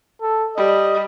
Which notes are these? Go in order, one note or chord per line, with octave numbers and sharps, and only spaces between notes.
A4
G3 D#5